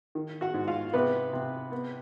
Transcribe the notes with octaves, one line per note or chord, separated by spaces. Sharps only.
D#3
F#4 F#5
G#2
F4 F5
C3 B3 B4
C3
B3